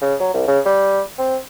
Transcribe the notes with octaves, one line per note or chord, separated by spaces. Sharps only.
C#3
F#3
C2
C#3
G3
C4